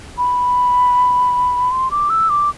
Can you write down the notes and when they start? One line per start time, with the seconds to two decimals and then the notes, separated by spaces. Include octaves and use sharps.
0.18 B5
1.71 C6
1.91 D6
2.10 E6
2.29 D6